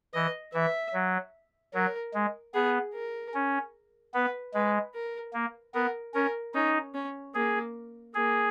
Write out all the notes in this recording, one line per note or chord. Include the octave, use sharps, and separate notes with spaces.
E3 D#5
E3 E5
F#3
F#3 A#4
G#3
B3 G#4
A#4
C#4
B3 B4
G#3 B4
A#4
A#3
B3 A#4
C#4 A#4
C#4 D#4
C#4
A#3 G#4
A#3 G#4